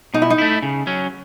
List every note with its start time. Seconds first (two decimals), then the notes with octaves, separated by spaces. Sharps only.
0.14 B2 D#4
0.22 E4
0.30 D#4
0.38 A3 E4
0.62 C#3
0.87 F#3 C#4